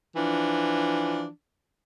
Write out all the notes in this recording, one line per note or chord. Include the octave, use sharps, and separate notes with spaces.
E3 F3 D4